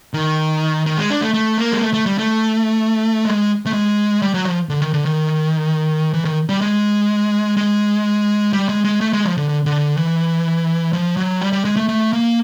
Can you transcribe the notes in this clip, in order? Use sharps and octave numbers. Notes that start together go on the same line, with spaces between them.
D#3
D#3
G#3
D4
A3
A3
A#3
G#3
A3
A3
G3
A3
G#3
A3
G#3
G3
F#3
F3
D3
D#3
D3
D#3
E3
D#3
G3
G#3
G#3
G3
G#3
G#3
A3
G#3
F3
D3
D3
D3
E3
F3
F#3
G3
G3
G#3
A3
A3
A#3